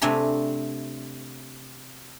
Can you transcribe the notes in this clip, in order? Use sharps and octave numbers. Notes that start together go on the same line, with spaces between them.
C3 A3 C4 D4 G#5 A#5